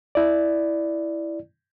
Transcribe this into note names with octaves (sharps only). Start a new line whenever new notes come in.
E4 D5